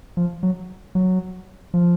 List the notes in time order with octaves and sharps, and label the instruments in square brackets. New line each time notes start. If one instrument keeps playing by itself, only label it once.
[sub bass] F3
F#3
F#3
F3